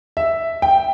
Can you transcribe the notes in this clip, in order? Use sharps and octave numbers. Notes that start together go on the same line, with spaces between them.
E5
G5